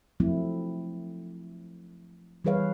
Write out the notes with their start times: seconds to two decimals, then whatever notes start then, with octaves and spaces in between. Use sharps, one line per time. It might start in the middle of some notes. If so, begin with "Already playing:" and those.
0.20 F3 F#3 A3 C4 E4
2.45 E3 G3 G#4 B4 C#5 F5